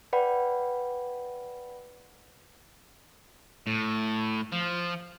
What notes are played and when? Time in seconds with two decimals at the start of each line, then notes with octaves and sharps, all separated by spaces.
0.13 B4 D5 F#5 G5 B5
3.67 A2
4.52 F3